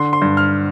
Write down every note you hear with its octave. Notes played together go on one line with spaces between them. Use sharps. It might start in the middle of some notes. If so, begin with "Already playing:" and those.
Already playing: D3 C6
C6
G2
F6